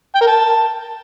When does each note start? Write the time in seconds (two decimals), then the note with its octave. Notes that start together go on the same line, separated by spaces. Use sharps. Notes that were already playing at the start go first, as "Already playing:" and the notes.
0.15 G5
0.21 A#4
0.27 A5